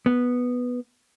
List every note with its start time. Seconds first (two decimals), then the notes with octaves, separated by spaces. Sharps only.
0.06 B3